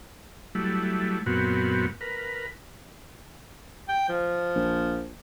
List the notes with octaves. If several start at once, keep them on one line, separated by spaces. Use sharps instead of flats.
F#3 G3 A3 E4
F#2 A#2 B3 C4 F#4
A#4 B4
G5
F3
A#1